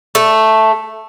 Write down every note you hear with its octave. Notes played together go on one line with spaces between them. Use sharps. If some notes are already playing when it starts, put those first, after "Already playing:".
A3